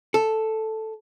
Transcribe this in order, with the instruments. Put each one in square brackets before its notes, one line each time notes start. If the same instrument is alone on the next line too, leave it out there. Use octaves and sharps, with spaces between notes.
[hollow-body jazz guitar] A4